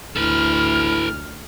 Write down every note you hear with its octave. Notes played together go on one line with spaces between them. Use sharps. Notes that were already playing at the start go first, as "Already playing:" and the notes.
D2 E4 A4 B4 F6